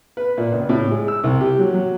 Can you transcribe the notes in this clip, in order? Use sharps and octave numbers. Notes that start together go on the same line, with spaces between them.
B4
A#2
C#2
A2
G#3
E6
C2
G4
F#3
F#3